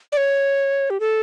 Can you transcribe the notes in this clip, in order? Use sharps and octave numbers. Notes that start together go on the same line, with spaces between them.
D5
C#5
G4
A4